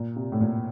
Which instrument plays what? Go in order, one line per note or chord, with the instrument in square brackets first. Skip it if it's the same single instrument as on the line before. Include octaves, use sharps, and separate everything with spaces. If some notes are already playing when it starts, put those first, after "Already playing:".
Already playing: [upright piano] A#2
C3
A2
A#2